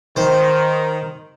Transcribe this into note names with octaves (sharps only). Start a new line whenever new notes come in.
D#3 C5